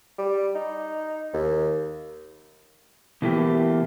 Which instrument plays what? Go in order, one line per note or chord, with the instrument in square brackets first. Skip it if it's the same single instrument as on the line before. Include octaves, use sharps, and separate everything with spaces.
[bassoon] G3
D#4
D#2
[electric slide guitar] B2 E3 A3 A#3 G4